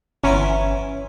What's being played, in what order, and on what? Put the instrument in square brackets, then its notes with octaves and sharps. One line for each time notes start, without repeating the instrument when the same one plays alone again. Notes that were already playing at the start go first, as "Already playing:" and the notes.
[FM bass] G1 [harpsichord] E3 B3 E4 [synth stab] C#4 [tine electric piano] C#5 A#5 C6